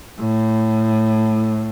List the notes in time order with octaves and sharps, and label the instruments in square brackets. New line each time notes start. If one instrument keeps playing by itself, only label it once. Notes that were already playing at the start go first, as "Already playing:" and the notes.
[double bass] A2